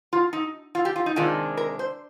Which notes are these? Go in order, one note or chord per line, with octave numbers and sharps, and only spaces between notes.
F4
D#4
F4
G4
F4
D#4
C3 D#3 G#3 D4 F4
A#4
C5